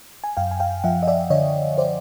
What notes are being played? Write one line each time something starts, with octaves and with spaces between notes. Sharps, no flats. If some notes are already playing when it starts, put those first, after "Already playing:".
G#5
F#2 F5 G5
G#5
F5 G5
F3 E5 F#5
D#5
D5 E5
D3 C#5 D#5
C5 D5